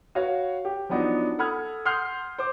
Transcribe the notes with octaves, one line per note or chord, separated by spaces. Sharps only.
F#4 B4 C#5 F5
G4
F3 F#3 B3 D4 D#4
A4 F#5 B5 D#6 F6 G#6
F#5 C6 D#6 F6 G6 C7
C5 D6